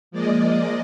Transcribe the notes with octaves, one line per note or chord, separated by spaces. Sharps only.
F3 G#3 A#3 D5 D#5